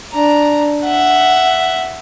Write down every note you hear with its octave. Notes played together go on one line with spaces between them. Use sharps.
D4 A#5
E5 F#5